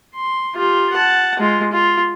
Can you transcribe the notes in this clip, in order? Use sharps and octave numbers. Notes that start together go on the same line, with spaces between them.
C6
F4 G4
F#5 A5
G#3 F4
F4